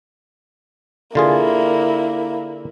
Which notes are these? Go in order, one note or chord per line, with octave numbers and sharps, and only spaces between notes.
D3 A#3 E4 F4 G#4